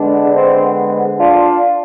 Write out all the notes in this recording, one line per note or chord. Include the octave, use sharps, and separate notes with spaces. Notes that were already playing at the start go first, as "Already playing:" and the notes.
Already playing: D3 G#3 B3 D4
C4
D4 F4